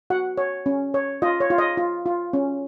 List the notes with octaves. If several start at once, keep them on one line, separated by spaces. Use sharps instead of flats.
F#4 F#5
C#5
C#4
C#5
F4 D#5
C#5
F4
D#5
F4
F4
C#4